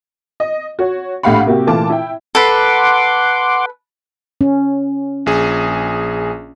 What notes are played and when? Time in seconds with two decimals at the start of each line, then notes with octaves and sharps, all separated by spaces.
0.40 D#5
0.79 F#4 C#5
1.23 A#1 A2 G4 F5 F#5 B5
1.46 C3 A#3 F#4 G4
1.67 A#2 E3 A3 F4 A5 D6
1.90 E4 G5
2.35 A4 B4 F#5 C6 D6
4.41 C#4
5.26 A#1 G#4